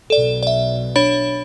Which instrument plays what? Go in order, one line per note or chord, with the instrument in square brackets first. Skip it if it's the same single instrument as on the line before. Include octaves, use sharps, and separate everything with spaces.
[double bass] B1 B2 [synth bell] A4 D5
[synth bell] D5 E5
D4 C#5 B5